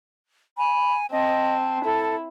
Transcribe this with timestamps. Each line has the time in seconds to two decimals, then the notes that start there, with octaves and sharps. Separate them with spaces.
0.58 G#5 B5
1.12 C4 D#5 A5
1.84 E4 A4